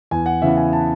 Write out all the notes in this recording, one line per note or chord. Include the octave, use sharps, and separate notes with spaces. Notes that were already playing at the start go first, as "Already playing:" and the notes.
E2 G#5
F#5
C#3 E3 B3 E5
G#5
A5